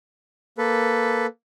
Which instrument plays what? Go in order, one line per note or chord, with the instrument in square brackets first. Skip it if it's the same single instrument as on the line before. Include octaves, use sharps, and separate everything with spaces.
[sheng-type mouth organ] A#3 A4 B4